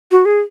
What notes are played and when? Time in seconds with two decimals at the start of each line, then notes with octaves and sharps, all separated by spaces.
0.11 F#4
0.25 G#4